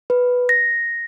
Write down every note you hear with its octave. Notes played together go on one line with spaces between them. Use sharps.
B4
A#6